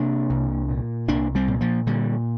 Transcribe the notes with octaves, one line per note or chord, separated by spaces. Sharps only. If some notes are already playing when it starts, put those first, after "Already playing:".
Already playing: C3 A#3 D4
C2
A#2
C2 A#3 D4
G3 C4
A#2
F3 A#3
A#2 D3 G3